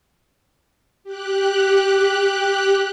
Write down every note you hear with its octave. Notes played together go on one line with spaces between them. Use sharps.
G4 F#6